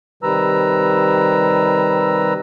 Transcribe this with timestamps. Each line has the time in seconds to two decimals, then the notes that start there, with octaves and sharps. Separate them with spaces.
0.23 C3 D#3 G3 B4 A#5 E6